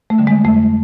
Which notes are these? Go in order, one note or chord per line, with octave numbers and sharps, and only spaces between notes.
A3
D3 G3
G#3
F2 A3